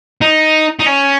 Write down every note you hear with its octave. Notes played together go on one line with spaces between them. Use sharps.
D#4
D#4
C#4